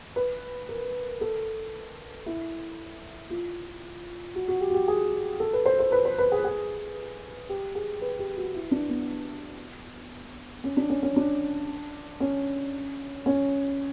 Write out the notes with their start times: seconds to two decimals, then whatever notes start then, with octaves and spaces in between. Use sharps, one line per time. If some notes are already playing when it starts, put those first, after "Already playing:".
0.16 B4
0.69 A#4
1.21 A4
2.26 E4
3.30 F4
4.35 F#4
4.48 F#4
4.61 G4
4.70 F#4
4.74 G4
4.88 G#4
5.40 A4
5.53 B4
5.66 C5
5.80 C5
5.92 B4
6.05 C5
6.18 B4
6.32 G#4
6.45 G#4
7.49 G4
7.75 G#4
8.02 B4
8.19 G4
8.37 F#4
8.54 E4
8.71 D4
8.89 B3
10.64 C#4
10.77 D4
10.90 C#4
11.03 C#4
11.16 D4
12.20 C#4
13.26 C#4